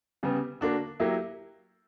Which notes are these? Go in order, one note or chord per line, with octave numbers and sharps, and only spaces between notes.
C#3 G3 B3
D3 A#3 D4 F#4
F#3 A#3 E4 G4